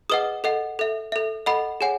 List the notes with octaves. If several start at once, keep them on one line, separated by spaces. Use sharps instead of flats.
G#4 B4 D#5 F#5 D#6
A4 D#5 F#5
A4 E5
A4 E5
A4 D#5 F#5 B5
G#4 C#5 F#5 G#5